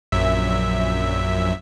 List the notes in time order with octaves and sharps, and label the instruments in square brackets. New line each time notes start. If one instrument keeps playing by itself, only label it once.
[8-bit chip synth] A#1 F#2 E5